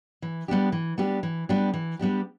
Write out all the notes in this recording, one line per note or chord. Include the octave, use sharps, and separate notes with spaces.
E3
G3 B3 D4 G4
E3
G3 B3 D4 G4
E3
G3 B3 D4 G4
E3
G3 B3 D4 G4